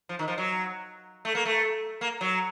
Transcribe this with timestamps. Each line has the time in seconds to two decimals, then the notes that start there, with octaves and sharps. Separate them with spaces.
0.09 F3
0.19 D#3
0.28 F3
0.38 F#3
1.25 A3
1.35 A#3
1.45 A3
2.01 A#3
2.21 F#3